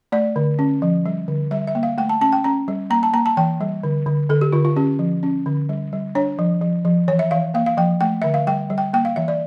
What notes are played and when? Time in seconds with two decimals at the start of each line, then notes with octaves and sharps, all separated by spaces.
0.12 A3 D5
0.36 D3
0.59 C#4
0.82 F3
1.06 G3
1.28 D3
1.51 G3 E5
1.67 E5
1.75 A#3
1.83 F5
1.98 A3 G5
2.09 A5
2.21 C#4 A5
2.32 G5
2.44 C#4 A#5
2.68 G3
2.90 A#3 A#5
3.03 A5
3.13 A#3 A#5
3.26 A5
3.37 E3 G5
3.61 G3
3.83 D3
4.06 D3
4.29 D3 A4
4.41 G4
4.53 D3 F4
4.65 F4
4.76 C#4 G4
4.99 F3
5.23 C#4
5.46 D3
5.69 G3
5.93 G3
6.15 D4 C#5
6.39 F3
6.61 F3
6.85 F3
7.08 E3 C#5
7.19 E5
7.31 E3 F5
7.54 A#3 F5
7.66 F5
7.77 F3 G5
8.01 A3 G5
8.22 D3 E5
8.34 F5
8.47 G3 G5
8.70 G3
8.78 G5
8.93 A#3 G5
9.05 F5
9.16 E3 E5
9.28 D5